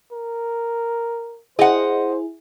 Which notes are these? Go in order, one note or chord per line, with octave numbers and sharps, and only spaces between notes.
A#4
E4 G#4 C5 D#5 F#5